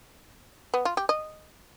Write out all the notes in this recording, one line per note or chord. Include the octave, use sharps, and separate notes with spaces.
B3
F4
G4
D#5